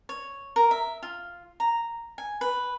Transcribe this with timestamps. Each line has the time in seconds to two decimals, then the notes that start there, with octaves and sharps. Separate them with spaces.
0.09 C#5
0.56 A#4
0.71 E5
1.03 F4
1.60 A#5
2.18 G#5
2.41 B4